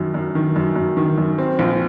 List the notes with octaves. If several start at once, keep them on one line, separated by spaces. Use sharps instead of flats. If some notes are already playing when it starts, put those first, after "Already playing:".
Already playing: F#2 D#3
F#2
D#3
F#2
F#2
D#3
F#2
C4
A#1